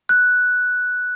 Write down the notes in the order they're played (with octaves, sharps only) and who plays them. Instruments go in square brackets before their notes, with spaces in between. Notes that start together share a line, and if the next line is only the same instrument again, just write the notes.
[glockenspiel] F#6